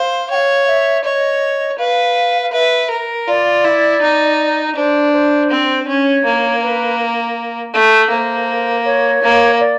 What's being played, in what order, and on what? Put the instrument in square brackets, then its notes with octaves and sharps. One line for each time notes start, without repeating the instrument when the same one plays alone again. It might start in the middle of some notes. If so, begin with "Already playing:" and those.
Already playing: [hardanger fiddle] C5 [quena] F5
[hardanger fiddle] C#5 [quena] G5
[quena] F5
E5
[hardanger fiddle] C#5 [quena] D#5
[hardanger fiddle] B4 [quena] F5
[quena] F5
[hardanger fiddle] B4 [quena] E5
[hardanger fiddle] A#4
[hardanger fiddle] F4 [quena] D5
[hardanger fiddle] E4
D#4
[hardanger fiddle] D4 [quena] C5
[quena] C5
[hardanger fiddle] C4
[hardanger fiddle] C#4 [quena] C#5
[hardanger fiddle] A#3
[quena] B4
[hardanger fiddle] A3
[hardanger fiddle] A#3 [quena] C5
[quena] C#5
[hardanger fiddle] A#3
[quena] D5